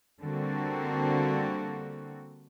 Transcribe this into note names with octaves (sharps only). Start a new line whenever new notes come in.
D3 G3 A#3 C4 F#4 A4